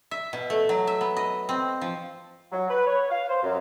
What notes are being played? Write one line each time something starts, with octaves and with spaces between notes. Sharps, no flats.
E5
B2
A3
F#3
E5
B3
D#5
C4
F3
F#3
B4
C#5
F5
C5
F#2